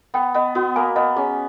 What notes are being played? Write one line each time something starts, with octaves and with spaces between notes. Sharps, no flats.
B3 G5
B3 D#5
B3 F#4
A#3 G#5
B3 D#5
C#4 G#4